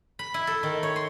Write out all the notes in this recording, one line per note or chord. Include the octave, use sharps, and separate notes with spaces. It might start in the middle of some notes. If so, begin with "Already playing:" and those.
B5
E4
A4
D#3
C#5
C6